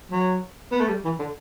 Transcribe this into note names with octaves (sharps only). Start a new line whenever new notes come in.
F#3
B3
A3
G3
E3
D3